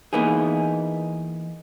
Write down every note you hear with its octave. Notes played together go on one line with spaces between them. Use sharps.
E3 A#3 B3 D#4 G#4